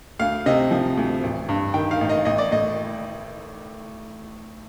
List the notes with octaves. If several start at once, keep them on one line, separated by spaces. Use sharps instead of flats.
D2 F5
C3 D#5
F3
D2
A1
G2
D#3 G5
F5
A1
D#5
A1 D#5
D5
A2 D#5